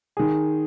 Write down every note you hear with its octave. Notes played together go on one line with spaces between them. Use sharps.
D#3 G#4